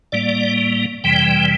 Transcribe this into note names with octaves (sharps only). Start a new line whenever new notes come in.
A2 G3 A#3 D5
F2 C3 E3 G3 G5